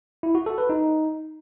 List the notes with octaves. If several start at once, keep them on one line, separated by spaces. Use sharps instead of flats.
E4
F#4
A4
B4
D#4